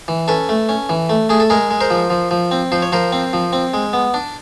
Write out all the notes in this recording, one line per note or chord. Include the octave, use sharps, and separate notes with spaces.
E3
C#4 A4 B4
A3
C#4
E3
A3
A3 G#4
A4
G#3 G#4 A#4
G#3
A#4 C5
F3
F3
F3
C4
F3 C5
C#5
F3 A#4 C5
C4
F3
C4
G#3
B3
D4